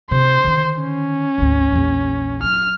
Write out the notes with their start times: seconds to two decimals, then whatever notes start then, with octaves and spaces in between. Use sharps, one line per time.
0.11 C3 C5
0.44 D3 D#3
0.81 C#4
1.38 G#1 D2
1.72 A#1 E2
2.43 F#3 F6